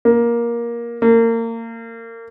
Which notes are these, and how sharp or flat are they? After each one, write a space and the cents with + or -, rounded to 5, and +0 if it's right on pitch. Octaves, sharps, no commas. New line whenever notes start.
A#3 +15
A#3 -30